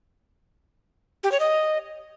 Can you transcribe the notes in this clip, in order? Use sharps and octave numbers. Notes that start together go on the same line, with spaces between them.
G4
C#5
D#5